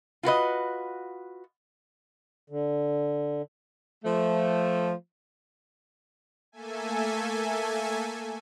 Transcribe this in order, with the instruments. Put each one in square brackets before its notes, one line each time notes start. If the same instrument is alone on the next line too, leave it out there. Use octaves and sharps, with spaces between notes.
[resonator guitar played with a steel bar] F4 F#4 B4 D#5
[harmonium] D3
[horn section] F3 A3
[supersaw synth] A3 A#3 A4 E5 G#5